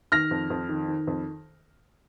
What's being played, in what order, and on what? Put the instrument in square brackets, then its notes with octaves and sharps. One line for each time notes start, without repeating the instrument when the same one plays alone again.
[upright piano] D#3 F6 A#6
F2
F2
D#3
D#3
F2